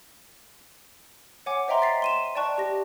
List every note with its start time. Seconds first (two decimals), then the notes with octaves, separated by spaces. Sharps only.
1.46 C#5 F#5 G#5 D6
1.68 C5 D#5 E5 G5 A#5 C6
1.82 A6 B6 C7
2.02 C6 D#7 E7
2.35 D5 G5 A5 C#6 F#6
2.58 G4 A#6